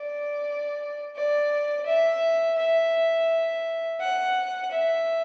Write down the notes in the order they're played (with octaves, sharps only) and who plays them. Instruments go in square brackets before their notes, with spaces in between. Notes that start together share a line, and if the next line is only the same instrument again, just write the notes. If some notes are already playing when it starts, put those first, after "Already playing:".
Already playing: [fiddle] D5
D5
E5
E5
F#5
E5